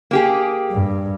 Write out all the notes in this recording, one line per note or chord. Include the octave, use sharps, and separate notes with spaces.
A#3 G4 G#4
G2